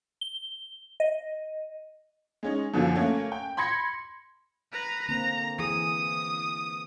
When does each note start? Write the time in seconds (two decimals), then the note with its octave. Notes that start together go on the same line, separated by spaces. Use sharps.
0.21 G7
1.00 D#5
2.43 G#3 C#4 D#4
2.74 F#2 D3 F3 F#3 A#3
2.96 A3 A#3 C#4
3.32 G5
3.57 B5 C6 G#6 A#6 C#7
4.73 B4 A#5
5.08 D3 A#3 C4 A#5
5.59 E3 G#4 D#6